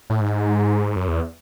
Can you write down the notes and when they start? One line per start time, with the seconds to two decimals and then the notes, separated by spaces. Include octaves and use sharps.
0.10 A2
0.20 G#2
0.96 F#2
1.08 E2